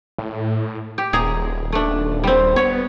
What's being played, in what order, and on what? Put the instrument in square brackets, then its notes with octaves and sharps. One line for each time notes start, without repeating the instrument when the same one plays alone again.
[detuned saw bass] A2
[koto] G4
[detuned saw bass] D#1 [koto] G#4 A#5
[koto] A3 D4
G3 C4
[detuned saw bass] B3 [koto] C#5